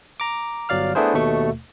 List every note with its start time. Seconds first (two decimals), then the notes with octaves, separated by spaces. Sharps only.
0.20 A#5 D6
0.69 G1 F#3 D5 F5 F6
0.95 A3 B3 D4 E4 G#4 C5
1.14 D#2 B2 A3 C#6